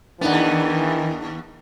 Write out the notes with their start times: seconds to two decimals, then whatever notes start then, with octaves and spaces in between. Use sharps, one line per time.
0.21 D#2 D#3 E3 B3 D4 D#4 F#5